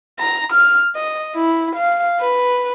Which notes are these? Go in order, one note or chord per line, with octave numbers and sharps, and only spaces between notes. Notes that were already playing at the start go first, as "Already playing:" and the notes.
A#5
F6
D#5
E4
F5
B4